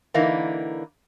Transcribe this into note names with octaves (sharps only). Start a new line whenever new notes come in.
D3 E3 A#3 D#4 E4